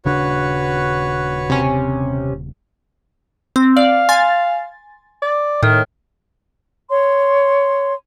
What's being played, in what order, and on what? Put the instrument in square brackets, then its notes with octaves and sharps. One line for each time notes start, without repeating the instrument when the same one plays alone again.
[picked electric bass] D#1 C#3 D4 [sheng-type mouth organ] F#4 B4 C#5
[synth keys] C3 C#4
[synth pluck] C4
[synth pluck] D5 [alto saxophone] F5
[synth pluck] G#5 C6 A6
[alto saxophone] D5
[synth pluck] A2 [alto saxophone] D#3
[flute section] C#5 C6